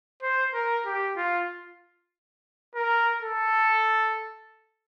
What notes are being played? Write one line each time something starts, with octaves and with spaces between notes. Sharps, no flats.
C5
A#4
G4
F4
A#4
A4